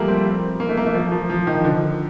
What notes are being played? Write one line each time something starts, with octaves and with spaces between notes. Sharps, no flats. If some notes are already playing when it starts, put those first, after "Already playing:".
Already playing: F3 G3 A3 A#3
C4
A#3
A3
A#3
A3
F3
F3
F3
D#3
D3